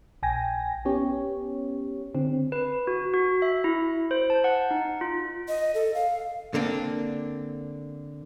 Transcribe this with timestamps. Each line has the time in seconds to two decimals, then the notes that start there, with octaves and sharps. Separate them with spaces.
0.23 A#1 G5 G#5 A#6
0.85 B3 C#4 G4 C#5
2.15 D3 C4
2.52 B4
2.87 F#4
3.14 F#4
3.42 E5
3.64 E4
4.11 C5
4.30 A5
4.44 F#5
4.71 D#4
5.01 F4
5.48 D#5
5.75 A4
5.94 F5
6.54 D3 A#3 C4 D4